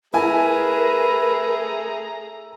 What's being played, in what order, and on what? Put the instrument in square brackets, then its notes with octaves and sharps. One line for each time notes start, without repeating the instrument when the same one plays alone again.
[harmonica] A3 G#4 A#5 [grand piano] E4 G#5 [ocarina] A#4 [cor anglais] B4